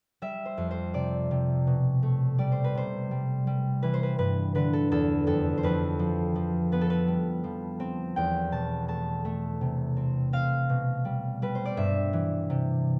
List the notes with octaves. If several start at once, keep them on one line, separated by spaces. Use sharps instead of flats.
G3 E5
C5
F2
C5
C3 D5
C3
B2
A3
G3 D5
C5
B4
C3 C5
G3
G3
E3 B4
C5
B4
G2 B4
D3 B4
A4
E2 A4
F2 A4
C5
F2 B4
F3
F3
B3 B4
A4
B4
G3
F3
C4
E2 G5
B2 A5
A3 A5
A3
C3
C4
C4 F5
B2
G3
G3 B4
C5
D5
G2 E5
E3
C3